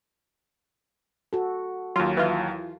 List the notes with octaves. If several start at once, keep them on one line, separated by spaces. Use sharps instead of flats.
F#4 A4
D#2 F#3 F4
E3 F4